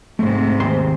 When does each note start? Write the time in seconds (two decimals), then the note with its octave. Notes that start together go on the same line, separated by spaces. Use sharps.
0.19 G#2 C3 A3
0.60 D#2 C5 C6